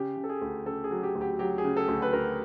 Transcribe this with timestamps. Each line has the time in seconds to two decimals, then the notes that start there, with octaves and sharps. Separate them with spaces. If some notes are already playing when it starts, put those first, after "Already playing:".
Already playing: C#3 G4
0.17 C#3
0.24 A4
0.29 G#4
0.41 D2
0.66 C#3 A4
0.84 G#4
0.91 F#3
1.03 G4
1.15 D2
1.21 G4
1.39 F#3 G4
1.58 G#4
1.64 C#3
1.77 A4
1.88 D2
2.02 B4
2.13 D2 A#4